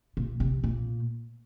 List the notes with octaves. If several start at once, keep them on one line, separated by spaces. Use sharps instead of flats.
A#2
C3
A#2